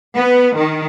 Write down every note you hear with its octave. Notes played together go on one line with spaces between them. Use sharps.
B3
D#3